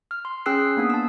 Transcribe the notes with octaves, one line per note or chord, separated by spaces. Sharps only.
F6
C6
C#4 G#4 G5 E6 F#6 C7
E6
A#3 B3 D4 D#6
A5 E6